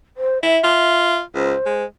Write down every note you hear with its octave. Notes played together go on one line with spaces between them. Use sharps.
C5
E4 E5
F4
C#2 C5
G#3